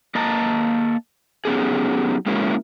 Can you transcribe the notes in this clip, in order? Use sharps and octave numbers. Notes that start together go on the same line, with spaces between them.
A#3 D#5 A5 A#5
F#3 B3 C#4 D#4 G4 G#4
G#3 A#3 C#4 E4 F#4